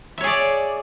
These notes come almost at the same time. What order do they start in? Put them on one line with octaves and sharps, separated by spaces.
E5 C#5 G#4 D5